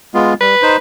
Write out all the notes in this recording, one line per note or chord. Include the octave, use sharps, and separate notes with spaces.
G#3 B3 F4
G3 B4
D#4 C5